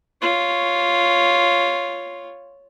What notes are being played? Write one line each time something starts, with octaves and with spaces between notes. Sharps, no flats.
F4 C#5